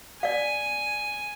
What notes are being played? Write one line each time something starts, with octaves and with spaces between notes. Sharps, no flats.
D5 F5 G#5